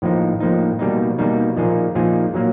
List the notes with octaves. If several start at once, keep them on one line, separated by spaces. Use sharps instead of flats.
A2 F3 A#3 D#4
A2 F3 A#3 D#4
B2 G3 A#3 D#4
B2 G3 A#3 D#4
A#2 F3 A#3 D#4 G#4
A#2 F3 A#3 D#4 G#4
A#2 F#3 A#3